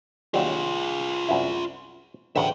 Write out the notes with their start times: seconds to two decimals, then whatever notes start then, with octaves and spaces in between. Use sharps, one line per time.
0.34 D#2 F#3 G3 F4 G#4
1.28 C2 F#2 E4
2.36 A1 D2 C#3 E5 G5